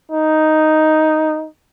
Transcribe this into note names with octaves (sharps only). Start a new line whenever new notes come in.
D#4